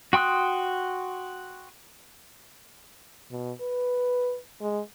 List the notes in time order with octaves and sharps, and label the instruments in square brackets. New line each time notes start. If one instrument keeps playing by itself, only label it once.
[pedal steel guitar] F#4 G5 C6 D#6 F#6
[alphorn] B2
B4
G#3